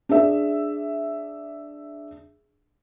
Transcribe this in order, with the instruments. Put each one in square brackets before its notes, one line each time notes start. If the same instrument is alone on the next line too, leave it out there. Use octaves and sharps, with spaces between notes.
[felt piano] D4 G#4 E5